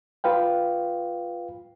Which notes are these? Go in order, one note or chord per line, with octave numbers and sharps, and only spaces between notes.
F4 B4 F5 G5